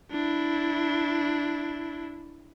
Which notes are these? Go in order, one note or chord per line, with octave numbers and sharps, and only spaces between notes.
D4 E4